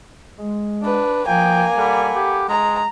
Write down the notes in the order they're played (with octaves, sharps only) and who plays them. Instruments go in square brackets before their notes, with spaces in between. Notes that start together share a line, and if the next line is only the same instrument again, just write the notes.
[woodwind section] G#3
[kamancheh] D4 B4
[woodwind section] F3 [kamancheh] A#3 G#5 [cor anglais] G5
[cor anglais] G3 [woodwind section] A4 F#5 B5
[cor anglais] G4
[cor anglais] G#3 [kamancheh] A#5